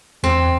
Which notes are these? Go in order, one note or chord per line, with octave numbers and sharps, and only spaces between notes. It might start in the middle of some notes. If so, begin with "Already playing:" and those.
E2 C4